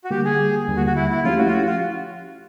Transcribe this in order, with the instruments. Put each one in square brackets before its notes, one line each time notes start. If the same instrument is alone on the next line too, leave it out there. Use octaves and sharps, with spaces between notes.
[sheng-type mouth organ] F#4
[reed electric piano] D3 G3 A#3 [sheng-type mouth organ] G4
[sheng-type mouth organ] G#4
[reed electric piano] D#2 D3 G3 A#3
[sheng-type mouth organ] F#4
F#4
E4
E4
[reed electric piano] F3 A3 C#4 E4 G4 [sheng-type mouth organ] F4
[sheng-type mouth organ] F#4
F4
F#4
F4